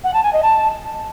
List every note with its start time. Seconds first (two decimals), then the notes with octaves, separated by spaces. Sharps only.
0.04 F#5
0.13 A5
0.23 G#5
0.33 D#5
0.43 A5